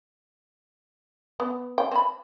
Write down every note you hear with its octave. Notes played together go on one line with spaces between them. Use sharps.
B3
G5
C4 B5